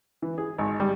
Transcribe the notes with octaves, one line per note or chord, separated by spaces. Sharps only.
E3
G#4
G#1
G3